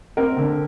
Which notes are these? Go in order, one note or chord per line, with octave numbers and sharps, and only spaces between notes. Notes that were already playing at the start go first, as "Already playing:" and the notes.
C4 A#4
D3